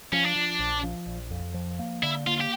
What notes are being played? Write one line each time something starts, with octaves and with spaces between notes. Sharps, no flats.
F3 C#4
D4
F3
A#1
F3
A#1
F2
F3
A#3
D3 E4
A#3 F4
G4